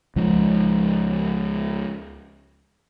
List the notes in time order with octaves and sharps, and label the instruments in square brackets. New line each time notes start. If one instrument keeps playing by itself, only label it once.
[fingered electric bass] C#2 C#3 F3 G#3